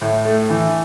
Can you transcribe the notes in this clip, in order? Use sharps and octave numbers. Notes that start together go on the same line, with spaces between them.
A2
A3
E3